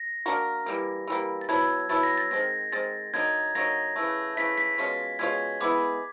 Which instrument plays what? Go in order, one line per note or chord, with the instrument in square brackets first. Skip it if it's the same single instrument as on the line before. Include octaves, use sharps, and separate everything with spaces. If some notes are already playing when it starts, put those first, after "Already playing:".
Already playing: [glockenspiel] A#6
[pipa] A#3 D4 F#4 A#4
E3 G3 A#3
E3 G3 A#3
[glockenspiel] A6
[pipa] F#3 B3 E4 A4 [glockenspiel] G#6
[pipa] F#3 B3 E4 A4 [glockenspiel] A6
[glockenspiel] A#6
A6
[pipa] D#3 G#3 C4 [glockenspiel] A#6
[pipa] D#3 G#3 C4 [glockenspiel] A6
[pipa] D3 F#3 A#3 D#4 [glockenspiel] G#6
[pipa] D3 F#3 A#3 D#4 [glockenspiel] A#6
[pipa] C#3 E3 A3
[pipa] C#3 E3 A3 [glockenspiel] B6
[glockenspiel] B6
[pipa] B2 G#3 C#4 F4
[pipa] B2 G#3 C#4 F4 [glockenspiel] G#6
[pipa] G#3 B3 E4 G#4 [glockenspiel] D6